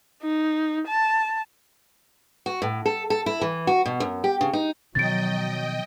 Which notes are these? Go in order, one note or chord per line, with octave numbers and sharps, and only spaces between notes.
D#4
A5
F#4
A2
A4
A4
E4
E3
F#4
B2
F#2
G4
C#3
D#4
B2 D#3 F3 F#3 D#5 G5 A6 D7